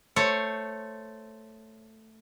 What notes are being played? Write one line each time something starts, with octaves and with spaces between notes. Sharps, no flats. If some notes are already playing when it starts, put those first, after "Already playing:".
A3 C5 C#5